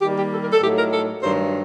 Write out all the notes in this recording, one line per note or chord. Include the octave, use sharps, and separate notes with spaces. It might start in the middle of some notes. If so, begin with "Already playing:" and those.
D#3 G3 A#3 G4
G4
A4
A#4
A4
A2 F#3 A3 D#4 G4
A#4
A4
G2 D#3 F#3 C5